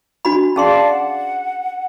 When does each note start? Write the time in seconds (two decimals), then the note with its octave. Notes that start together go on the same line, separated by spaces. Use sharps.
0.25 D4 F#4 B5
0.56 C#4 G#4 D5 F5 A5 C6
0.89 F#5